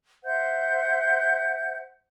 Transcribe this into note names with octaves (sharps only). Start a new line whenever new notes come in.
C5 E5 F#5 G6